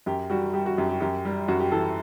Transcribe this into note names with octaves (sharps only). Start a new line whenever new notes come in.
F#2 G4
G3 F#4
G3 G4
F#4
F#2 G4
G4
F#2 G4
G3
F#2 F#4
G4
E3 A4